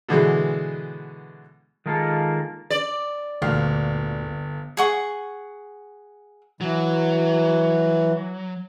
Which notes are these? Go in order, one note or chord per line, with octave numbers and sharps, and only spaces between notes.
B2 D3 E3 G#3
D#3 G#3 A#3 F4 A4
D5
G1 D2 A#2 F5 F6
G#4 F#5 C#6
E3 F#3